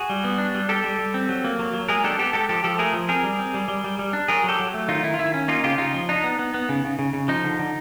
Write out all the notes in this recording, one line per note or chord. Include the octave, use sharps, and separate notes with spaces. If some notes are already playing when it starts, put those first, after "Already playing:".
Already playing: F#4 G#4
G3
B3
D4
G3
G3 G4 A4
G3
G3
C4
F#3
A#3
F#3
F#3
G#3 G#4 A#4
D4 G4 A4
B3 G4 A4
G#3 G4 A4
F3 G4 A4
F3 G4 A4
A3 G#4 A#4
F3
C4 G#4 A#4
G3
C4
G3
G3
G3
G3
D4
F#3 G#4 A#4
F#3 G4 A4
F#3
A3
D#3 D#4 F4
D#3 E4
F4
D#3 E4
C#4
A#3 D#4 F4
C#3 F4 G4
C#3 D#4 F4
F3
D4 D#4
B3
B3
B3
C#3
C#3
C#3
C#3
F3 D#4
D3
D3